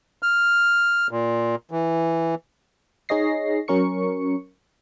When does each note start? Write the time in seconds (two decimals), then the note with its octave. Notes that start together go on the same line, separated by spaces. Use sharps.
0.23 F6
1.11 A#2
1.71 E3
3.09 D#4 G#4 C#5 D#5 A#6 C7
3.68 F#3 C#4 A#4 C#6 C#7